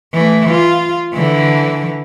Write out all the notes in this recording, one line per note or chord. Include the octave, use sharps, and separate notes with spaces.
E3 A3
F4
D3 E3